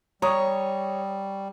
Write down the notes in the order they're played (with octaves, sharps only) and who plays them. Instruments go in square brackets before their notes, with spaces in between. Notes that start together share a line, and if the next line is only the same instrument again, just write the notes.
[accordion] G3 [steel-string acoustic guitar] C#5 [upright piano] A#5 C#6 D#6